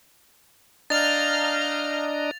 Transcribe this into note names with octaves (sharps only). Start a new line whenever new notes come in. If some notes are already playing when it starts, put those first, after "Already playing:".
D4 D#5 F5 A#5 F6 G6 A6 F7